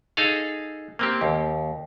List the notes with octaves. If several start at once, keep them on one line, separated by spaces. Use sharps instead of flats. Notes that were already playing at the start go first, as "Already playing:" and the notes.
D#4 G#4 A4 F5
A#3 C4 G4
D#2